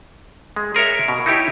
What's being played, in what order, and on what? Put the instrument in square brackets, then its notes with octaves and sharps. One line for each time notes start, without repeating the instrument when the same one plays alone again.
[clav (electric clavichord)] G#3
G#4 A#4 C#5 E5
B2
D#4 E4 G4 C#5